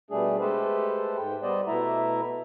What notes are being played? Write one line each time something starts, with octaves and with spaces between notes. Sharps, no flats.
B2 G3 A3 D4 G#4
G#3 A3 G4 A4 B4 C5
G#2 G5
G3 B3 C5 D5 D#5
B2 A3 E4 E5 A#5